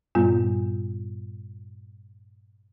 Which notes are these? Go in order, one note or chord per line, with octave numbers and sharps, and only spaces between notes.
G2 A#2 G3 B3 F4 G6